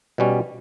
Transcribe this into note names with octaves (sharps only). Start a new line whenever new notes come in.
B2 G3 C#4